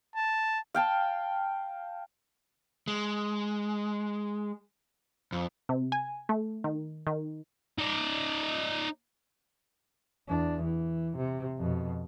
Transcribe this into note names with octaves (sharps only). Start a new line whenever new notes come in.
A5
F5 G5 A5
G#3
F2
C3
G#5
A3
D#3
D#3
D#4 D5
E2 D4
E3
C3
F2 B2